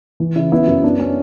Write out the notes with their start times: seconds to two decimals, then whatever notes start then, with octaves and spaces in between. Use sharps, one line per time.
0.20 E3
0.36 C#3 E4
0.52 B3 E4
0.67 F#2
0.84 B3 D4
0.99 B3 C#4